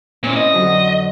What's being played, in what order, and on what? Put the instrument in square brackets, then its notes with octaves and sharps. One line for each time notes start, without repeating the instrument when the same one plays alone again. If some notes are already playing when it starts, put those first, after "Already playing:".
[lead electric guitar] A#2 [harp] C4 C#4 E4
[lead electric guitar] D#5
[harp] F2 D3 F#3